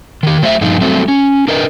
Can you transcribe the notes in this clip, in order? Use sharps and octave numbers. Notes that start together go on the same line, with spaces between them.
D#3 G4
F#3 A3 C5 D5 E5
G2 A#2 F3 D#4
F#3 G3 A3 C4
C#4
D4 A#4 B4 D#5